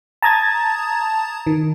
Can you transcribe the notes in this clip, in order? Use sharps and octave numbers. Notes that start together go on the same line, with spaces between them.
A5 A#5 D#6 G#6 A6
D#3